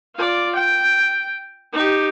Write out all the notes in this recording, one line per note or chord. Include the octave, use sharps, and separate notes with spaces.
F4 D5
G5
D#4 G4